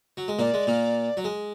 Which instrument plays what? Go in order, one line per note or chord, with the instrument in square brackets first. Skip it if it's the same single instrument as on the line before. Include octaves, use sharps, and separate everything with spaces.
[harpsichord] F#3
G#3
[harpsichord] A#2 A#3 [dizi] D5
[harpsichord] G#3
A#2 A#3
F#3
G#3